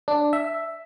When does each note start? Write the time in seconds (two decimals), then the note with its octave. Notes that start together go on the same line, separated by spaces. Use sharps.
0.08 D4
0.33 E5